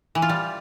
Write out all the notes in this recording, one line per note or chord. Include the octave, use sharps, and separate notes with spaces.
E3
F4
G3